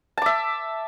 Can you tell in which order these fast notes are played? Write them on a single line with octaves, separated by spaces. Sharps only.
A5 D6 E5